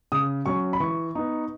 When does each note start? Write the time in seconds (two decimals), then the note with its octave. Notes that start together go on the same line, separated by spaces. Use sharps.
0.12 C#3 D#6
0.46 F#3 C#4 C#6
0.73 B5
0.80 E3 C#6
1.15 B3 D#4